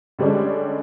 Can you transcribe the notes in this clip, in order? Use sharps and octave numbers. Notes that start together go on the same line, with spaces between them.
D3 G3 G#3 C#4 D4